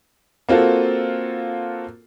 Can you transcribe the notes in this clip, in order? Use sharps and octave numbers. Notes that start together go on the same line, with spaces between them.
A#3 C4 F4 F#4 A4